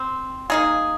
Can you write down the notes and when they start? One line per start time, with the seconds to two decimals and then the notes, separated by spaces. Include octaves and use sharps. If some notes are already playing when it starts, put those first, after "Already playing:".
Already playing: C4
0.50 A#3 D#4 G#4